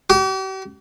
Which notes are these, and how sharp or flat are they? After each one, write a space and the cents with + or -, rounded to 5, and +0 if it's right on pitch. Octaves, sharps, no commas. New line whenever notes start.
G4 -45